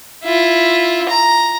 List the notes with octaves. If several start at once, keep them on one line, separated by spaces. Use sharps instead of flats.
E4 F4
A#5